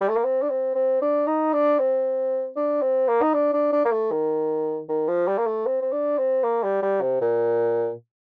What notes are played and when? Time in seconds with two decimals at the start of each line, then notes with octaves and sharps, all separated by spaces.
0.01 G3
0.09 A3
0.16 A#3
0.24 C4
0.42 D4
0.50 C4
0.75 C4
1.02 D4
1.27 D#4
1.53 D4
1.79 C4
2.56 D4
2.81 C4
3.08 A#3
3.22 D#4
3.34 D4
3.53 D4
3.72 D4
3.85 A#3
3.92 A3
4.11 D#3
4.89 D#3
5.08 F3
5.27 G3
5.38 A#3
5.46 A3
5.66 C4
5.81 C4
5.92 D4
6.18 C4
6.43 A#3
6.63 G3
6.82 G3
7.01 C3
7.21 A#2